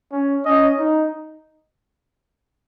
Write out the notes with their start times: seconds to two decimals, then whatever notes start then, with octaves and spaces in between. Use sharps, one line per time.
0.12 C#4
0.45 C#4 D#5
0.78 D#4